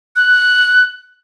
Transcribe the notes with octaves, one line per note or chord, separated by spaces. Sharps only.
F#6